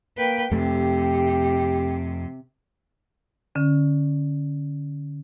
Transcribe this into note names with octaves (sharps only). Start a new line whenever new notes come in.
A#3 B4 G5
F2 C3 A3 G4
D3 C#4